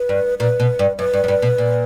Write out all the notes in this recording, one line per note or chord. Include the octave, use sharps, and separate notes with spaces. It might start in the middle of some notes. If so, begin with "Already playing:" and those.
Already playing: B4
G2
A#2 B4
B2
G2
F#2 B4
G2
F#2
G2
B2
A#2